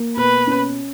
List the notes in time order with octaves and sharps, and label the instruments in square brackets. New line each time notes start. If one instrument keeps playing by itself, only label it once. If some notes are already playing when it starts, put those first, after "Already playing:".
Already playing: [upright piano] A#3
[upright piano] B2 [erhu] B4
[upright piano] C#4